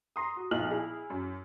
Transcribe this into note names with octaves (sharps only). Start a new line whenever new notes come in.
A#5 C6 D#6
F#4
B1 A#2 F3 D#4 F6 F#7
E4 G#4
F#2